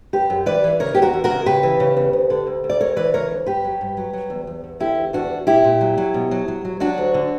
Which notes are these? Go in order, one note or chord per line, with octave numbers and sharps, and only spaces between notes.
F#2 G4 B4
F#2
E3 B4 D5
E3
C#3 A#4 C#5
E2 G4
F#4 A#4
E2
F#4 A#4
C#3
C#3 G4 B4
E3
C#3
E2
D2
D3
D2
D2
D5
D2 A#4 C#5
E3 B4 D5
C#3 A#4 C#5
D2
G2 G4 B4
F#3
G2
F#3
F#3
E2
E2
E2
D3 E4 G4
E2
E2 D4 F#4
E2
A#2 E4 G4
A#2
F#3
F#3
B2
F#3
F#3
F#3
F#3 D4 F#4
D2
D3